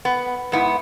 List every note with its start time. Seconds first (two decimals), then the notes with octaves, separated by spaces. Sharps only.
0.05 B3
0.52 G#2 B3 E4